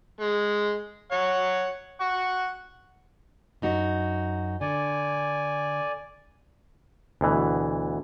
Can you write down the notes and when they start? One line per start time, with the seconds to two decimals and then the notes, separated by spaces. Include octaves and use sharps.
0.20 G#3
1.12 C#5 F#5
2.01 F#5 C#6
3.62 F#2 D#4 F#4
4.61 D3 D5 G#5
7.21 D2 B2 E3